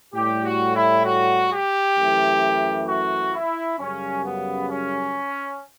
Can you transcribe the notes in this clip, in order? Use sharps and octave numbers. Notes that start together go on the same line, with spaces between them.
A2 G3 G4
F#4
E4
F#4
G4
F#2 E3 A3
F#4
E4
F#2 C#3 G3 C#4
B3
C#4